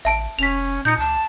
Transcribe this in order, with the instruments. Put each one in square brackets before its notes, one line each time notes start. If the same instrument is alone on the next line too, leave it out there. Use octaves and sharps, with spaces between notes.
[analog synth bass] A1 [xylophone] E5 A5 D7
[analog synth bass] F1 [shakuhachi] C#4 [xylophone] B6 F7
[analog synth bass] A#2 [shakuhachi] D#4 [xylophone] G6 C#7
[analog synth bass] C#2 [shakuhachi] A5